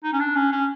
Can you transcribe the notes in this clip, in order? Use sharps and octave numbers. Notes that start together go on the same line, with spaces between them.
D#4
C#4
D4
C#4
C#4